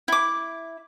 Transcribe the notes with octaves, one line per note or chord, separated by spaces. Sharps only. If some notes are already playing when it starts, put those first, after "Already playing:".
E4 D6